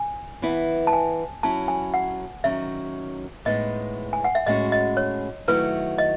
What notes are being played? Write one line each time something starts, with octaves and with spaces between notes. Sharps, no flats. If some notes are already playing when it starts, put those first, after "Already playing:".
Already playing: G#5
E3 B3 E4
A5
G#5
F#3 C#4 E4 A5
G#5
F#5
D#3 F#3 C#4 E5
A2 G#3 B3 D#4 D#5
G#5
F#5
E5
A2 G#3 C#4 F#4 D#5
D#5
C#5
D#3 F#3 A3 E4 B4
D#5